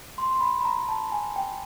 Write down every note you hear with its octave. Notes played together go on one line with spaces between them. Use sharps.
C6
C6
B5
B5
A#5
A5
G#5
G5